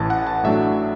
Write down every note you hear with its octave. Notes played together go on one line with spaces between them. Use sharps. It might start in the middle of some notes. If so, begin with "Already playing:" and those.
Already playing: A1 A2 E3 A5
F#5
A5
A2 F#3 A3 D4 E5